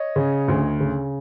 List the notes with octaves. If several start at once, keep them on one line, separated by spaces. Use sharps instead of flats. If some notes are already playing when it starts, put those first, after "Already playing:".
Already playing: C#5 D#5
C#3
D2
C#3